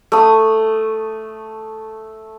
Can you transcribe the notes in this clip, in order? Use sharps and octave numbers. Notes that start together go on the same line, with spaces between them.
A3 D#6